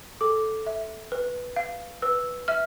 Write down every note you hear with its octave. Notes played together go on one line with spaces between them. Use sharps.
A4 D6
E5
B4
F5
B4 E6
E5 F6